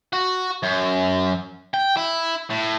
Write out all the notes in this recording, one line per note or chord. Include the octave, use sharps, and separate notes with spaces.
F#4
F#2
G5
E4
A2